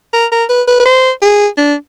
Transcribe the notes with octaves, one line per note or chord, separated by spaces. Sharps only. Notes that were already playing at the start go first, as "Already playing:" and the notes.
A#4
A#4
B4
B4
B4
C5
G#4
D4